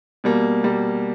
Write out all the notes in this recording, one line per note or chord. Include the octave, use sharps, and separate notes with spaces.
B2 G3 A#3
B2 G3 A#3